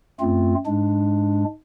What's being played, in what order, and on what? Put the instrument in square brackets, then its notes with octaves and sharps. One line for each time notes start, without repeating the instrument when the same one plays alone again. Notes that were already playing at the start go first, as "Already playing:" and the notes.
[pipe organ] F#2 A3 C4 F4
G#2 G#3 D4